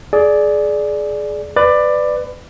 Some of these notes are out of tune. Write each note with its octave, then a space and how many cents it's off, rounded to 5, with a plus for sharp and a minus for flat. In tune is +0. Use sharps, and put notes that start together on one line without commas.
G#4 +25 D5 +0
B4 +20 D5 +15